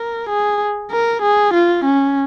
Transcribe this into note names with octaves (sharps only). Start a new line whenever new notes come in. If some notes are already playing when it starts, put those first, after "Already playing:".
Already playing: A#4
G#4
A#4
G#4
F4
C#4